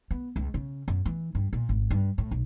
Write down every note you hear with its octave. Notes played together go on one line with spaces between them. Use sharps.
B3
C#2
C#3
F#2
E3
G2
A#2
G#1
G2
A2
B1